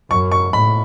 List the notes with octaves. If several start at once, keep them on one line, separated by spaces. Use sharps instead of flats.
F#2 C#6
C#6
A2 B5